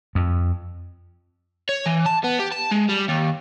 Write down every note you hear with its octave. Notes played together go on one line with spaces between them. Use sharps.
F2
C#5
E3
A5
B3
G4
A5
G#3
G3
D#2